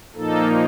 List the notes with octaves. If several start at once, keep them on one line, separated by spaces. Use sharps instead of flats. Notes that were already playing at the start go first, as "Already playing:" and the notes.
A#2 F3 A#3 D#4 A4